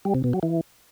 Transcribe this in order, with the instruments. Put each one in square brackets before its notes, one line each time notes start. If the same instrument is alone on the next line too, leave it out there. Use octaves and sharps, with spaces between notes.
[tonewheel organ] G3
C3
B2
F#3
E3